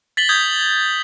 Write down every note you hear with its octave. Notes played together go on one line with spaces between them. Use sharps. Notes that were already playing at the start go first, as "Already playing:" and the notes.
A6 B6 F#7 G7
D#6 G6 G#6